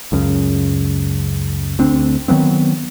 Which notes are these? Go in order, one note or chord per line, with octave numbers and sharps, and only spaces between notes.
C#2 F#2 C#3
D2 C4 D4
D#3 F#3 B3 C4